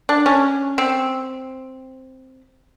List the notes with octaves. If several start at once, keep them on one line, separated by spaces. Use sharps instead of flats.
D4
C#4
C4